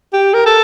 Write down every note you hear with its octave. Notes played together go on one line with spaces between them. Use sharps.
G4
A#4
A4